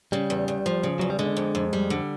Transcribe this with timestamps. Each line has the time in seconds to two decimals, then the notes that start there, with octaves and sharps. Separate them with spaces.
0.12 C#3 G3
0.30 E2
0.48 E2
0.66 F3
0.83 C#3
1.00 E2 F#3
1.10 G3
1.19 D3 G#3
1.37 F2
1.55 F2
1.73 G3
1.90 D3